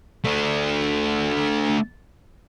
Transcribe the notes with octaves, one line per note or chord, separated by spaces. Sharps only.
A3 D4